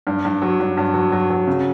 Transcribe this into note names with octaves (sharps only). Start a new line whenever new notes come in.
G2
G2
F#3
G2
G2
F#3
F#3
F#3
C#3